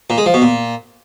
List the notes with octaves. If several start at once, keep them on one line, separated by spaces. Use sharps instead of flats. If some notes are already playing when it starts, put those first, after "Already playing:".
A#2
G#3
F3
B2
A#2